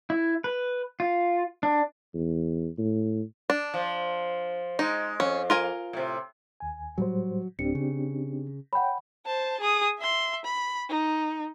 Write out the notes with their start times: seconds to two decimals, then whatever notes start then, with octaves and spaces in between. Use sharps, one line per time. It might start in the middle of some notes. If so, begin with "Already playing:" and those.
0.10 E4
0.44 B4
1.00 F4
1.63 D4
2.14 E2
2.78 A2
3.50 D4
3.74 F3
4.79 G#3 D#4
5.20 F2 C#4
5.50 F4 A#4 G#5
5.93 A2 C3
6.60 D#2 G#5
6.98 A2 F#3 G3 C5
7.59 D1 C4 D4 G4 C#7
7.75 C#3
8.73 C#5 F#5 G5 B5
9.26 C5 A5
9.60 G#4 D#6
9.99 E5 C6
10.45 B5
10.89 D#4